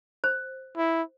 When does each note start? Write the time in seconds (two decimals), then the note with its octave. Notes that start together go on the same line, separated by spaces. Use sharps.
0.24 C5
0.77 E4